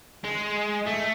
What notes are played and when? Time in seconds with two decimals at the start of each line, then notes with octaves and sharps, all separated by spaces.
0.25 G#3
0.87 A3